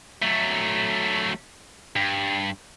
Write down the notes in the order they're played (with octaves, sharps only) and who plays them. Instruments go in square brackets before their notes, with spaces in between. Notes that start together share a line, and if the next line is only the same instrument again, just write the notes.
[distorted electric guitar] F#3 A3
G2